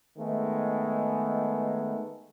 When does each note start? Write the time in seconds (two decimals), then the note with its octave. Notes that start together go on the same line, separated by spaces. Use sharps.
0.18 D#3 G#3 A3 B3